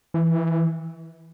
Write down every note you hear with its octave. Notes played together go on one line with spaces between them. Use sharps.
E3